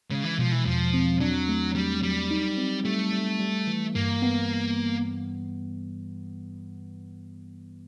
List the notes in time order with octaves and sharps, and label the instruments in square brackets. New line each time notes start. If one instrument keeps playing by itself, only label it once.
[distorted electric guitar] C#3 [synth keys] G#3
[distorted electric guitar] E3
[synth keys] B2 [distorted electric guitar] F3
[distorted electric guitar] E3
[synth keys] E2 [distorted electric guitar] F3
[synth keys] C4
[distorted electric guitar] F#3 [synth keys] D4
[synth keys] A3
[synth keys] F#3 [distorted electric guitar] G3
[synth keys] F#3 [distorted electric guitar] G3
[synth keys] D#4
C4
[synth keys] G3 [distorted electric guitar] A3
[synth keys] G3
G3
E3
[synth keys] G2 [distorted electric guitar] A#3
[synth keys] B3